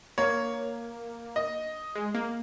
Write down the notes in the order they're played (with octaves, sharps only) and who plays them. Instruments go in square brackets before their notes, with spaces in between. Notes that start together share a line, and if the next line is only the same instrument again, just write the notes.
[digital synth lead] A#3 [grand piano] C#5
[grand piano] D#5
[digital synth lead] G#3
A#3